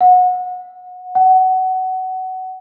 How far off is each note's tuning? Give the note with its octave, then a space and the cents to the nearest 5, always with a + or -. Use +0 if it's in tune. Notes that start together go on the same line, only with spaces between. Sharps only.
F#5 -25
F#5 +20